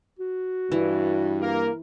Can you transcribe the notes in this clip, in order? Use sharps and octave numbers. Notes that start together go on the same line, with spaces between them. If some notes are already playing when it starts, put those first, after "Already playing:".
F#4
G2 E3
A#3 A#4